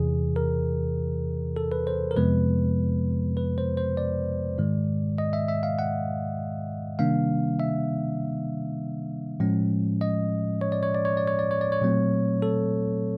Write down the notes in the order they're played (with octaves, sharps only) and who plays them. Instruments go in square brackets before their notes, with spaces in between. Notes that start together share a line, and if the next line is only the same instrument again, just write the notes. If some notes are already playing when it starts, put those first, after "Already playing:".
Already playing: [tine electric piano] E2 C3 E3 G#4
A#4
A4
B4
C5
A#4
F2 C3 F3 G#3 B3 B4
B4
C5
C5
D5
G#2 D#3 G#3
D#5
E5
E5
F5
F#5
C3 D#3 G3 A#3 D4 F5
E5
A2 F3 G#3 C#4
D#5
C#5
D5
C#5
D5
C#5
D5
C#5
D5
C#5
D5
C#5
A#2 F#3 A3 C4
A4